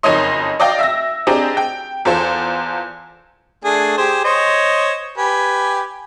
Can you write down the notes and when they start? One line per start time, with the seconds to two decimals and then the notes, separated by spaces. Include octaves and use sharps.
0.03 F#1 F2 D#4 C#5 D#5 C6
0.60 D5 D#5 F5 G5
0.79 E5 E6 A#6
1.27 C4 D4 G4 G#4 D#5 A#5
1.57 G5
2.05 E2 F4 A4 C5
3.65 A3 D4 G#4
3.98 G4 G#4 C5
4.24 C5 C#5 D#5
5.18 G4 B4 G#5